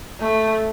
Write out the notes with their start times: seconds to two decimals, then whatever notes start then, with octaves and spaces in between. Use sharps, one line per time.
0.20 A3